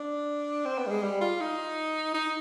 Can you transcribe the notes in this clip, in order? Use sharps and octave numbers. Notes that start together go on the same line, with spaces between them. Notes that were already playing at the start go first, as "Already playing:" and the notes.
Already playing: D4
C4
B3
G3
G#3
G3
F4
D#4
D#4